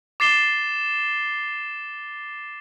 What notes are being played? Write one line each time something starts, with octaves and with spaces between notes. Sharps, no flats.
D6 A6 C7 E7 G7